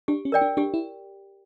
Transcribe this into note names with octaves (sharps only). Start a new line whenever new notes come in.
D4 G4
C#4
A#4 D5 G5
D4
D4 G4
E4